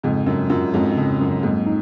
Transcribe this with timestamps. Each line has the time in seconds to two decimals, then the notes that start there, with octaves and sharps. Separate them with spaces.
0.03 F2 G#2 C#3
0.26 F#2 F#3
0.50 F#2 F4
0.74 F2 G#2 C#4
0.97 F2 C#3
1.20 F#2 F#3
1.43 F2 G#2 A#3
1.66 D#4